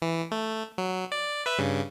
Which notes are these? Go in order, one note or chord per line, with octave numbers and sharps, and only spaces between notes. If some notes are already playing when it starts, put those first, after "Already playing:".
E3
A3
F#3
D5
B4 E5
G2 C#3